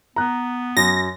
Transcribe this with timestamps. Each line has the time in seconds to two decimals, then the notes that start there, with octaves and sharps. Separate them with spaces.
0.16 B3 A#5 F#6
0.77 F#2 A#6